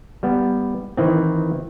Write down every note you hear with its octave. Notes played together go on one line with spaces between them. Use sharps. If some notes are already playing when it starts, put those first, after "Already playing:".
G3 B3
D#3 E3 C4